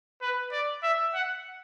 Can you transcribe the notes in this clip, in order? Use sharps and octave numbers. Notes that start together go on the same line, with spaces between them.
B4
D5
E5
F#5